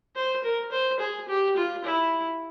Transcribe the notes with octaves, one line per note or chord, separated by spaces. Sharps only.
C5
A#4
C5
G#4
G4
F4
E4